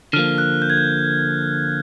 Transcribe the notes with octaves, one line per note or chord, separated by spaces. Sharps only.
D3 F3 A#3 F6
F#6
G6
G#6
G6